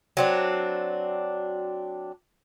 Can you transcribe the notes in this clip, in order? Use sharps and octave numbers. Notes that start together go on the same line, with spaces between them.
F#3 C4 D4